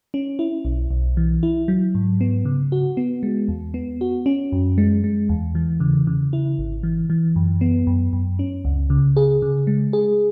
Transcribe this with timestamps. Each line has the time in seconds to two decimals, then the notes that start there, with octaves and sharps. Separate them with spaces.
0.14 C#4
0.39 E4
0.65 B1
0.91 B1
1.17 E3
1.43 E4
1.68 F#3
1.95 G#2
2.21 B3
2.45 C#3
2.72 F#4
2.97 B3
3.23 G#3
3.48 E2
3.74 B3
4.01 F#4
4.26 C#4
4.52 F#2
4.78 G#3
5.04 G#3
5.29 E2
5.55 E3
5.80 C#3
6.07 C#3
6.33 E4
6.58 G#1
6.83 E3
7.10 E3
7.36 F#2
7.61 B3
7.87 F#2
8.13 F#2
8.39 C#4
8.65 C#2
8.90 C#3
9.17 G#4
9.42 C#3
9.67 G#3
9.93 G#4